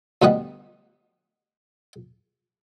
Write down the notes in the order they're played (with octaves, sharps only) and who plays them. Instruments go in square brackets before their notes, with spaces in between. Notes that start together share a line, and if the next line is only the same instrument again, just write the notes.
[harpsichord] D2 B2 G3 B4 D#5 F#5